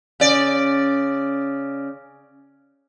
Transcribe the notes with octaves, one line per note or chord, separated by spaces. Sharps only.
C#3 D5